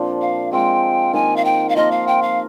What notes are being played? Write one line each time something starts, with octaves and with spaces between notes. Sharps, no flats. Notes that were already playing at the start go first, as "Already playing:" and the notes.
Already playing: A#2 F3 A#3 C4 D4
F5
G#3 C4 F4 G5
D#3 A#3 D#4 G#5
F5
G5
F5
F3 A#3 F4 D#5
F5
G5
F5